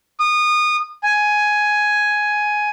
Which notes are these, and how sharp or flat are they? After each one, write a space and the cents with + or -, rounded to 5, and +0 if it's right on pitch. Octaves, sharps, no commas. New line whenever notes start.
D#6 -25
G#5 +10